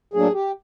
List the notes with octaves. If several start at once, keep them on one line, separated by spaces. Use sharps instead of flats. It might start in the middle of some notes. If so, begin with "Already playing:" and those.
A2 F#3 A#3 D4 G#4
G4